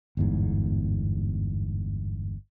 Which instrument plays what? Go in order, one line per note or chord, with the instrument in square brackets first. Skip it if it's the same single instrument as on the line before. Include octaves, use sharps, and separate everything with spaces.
[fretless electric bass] G1 E2 G#2